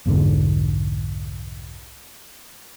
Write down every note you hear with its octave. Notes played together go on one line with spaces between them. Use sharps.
B1 F2 G#2 D3